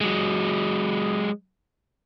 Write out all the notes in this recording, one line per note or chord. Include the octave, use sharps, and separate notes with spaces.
F#3 G#3